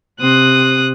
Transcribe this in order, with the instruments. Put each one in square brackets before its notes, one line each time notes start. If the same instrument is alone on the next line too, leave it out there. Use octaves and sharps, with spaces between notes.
[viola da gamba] C3 C4 [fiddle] D#6 F#6